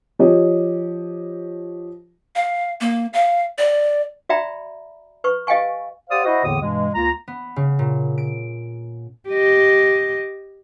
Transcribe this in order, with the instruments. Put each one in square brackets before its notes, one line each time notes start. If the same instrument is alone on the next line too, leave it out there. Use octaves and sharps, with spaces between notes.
[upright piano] F3 G4 C#5 D#5
[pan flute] F5
A#3
F5
D5
[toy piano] F#4 D5 E5 G5 A#5 B5
B4 C#6
G4 D#5 F5 G5 G#5 C#6
[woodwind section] G4 C5 D5 F5 F#5 D#6
E4 F#4 C5 D#5
E2 A2 D3 E3 A#3 D#6
G2 B2 E3 G#3
C#2 A#3 F4 A#5
[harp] B3
C#3
A#2
D7
[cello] G4 D#5